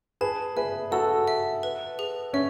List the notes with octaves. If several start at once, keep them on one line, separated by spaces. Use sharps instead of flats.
G#4 B4 A5
G#4 B4 E5
F#4 A4 E6
E5
B4
G#4
C#4 E5